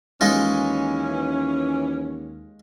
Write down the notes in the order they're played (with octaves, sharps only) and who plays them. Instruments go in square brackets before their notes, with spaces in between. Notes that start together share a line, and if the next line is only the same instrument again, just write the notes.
[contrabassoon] D#2 [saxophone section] E3 C#4 [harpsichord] G#3 D#4 F4